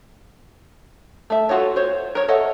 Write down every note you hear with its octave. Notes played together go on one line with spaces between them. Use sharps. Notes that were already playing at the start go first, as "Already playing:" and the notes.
A3 E5
F4 F#4 A4 C#5
C5 C#5
A#4 C#5
A4 C#5 D#5 E5 F#5